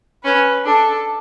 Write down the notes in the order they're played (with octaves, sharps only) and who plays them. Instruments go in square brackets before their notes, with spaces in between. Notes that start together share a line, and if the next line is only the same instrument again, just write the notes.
[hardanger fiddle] C#4 [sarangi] B4
[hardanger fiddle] D4 [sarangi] A4